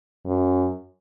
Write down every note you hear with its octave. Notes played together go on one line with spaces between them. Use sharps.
F#2